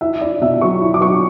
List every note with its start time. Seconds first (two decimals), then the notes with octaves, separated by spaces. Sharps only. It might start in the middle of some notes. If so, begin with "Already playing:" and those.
0.01 E4 E5
0.21 E4 D5
0.41 B2 E5
0.61 F#3 C#6
0.81 E4
0.94 D6
1.01 F#3 C#6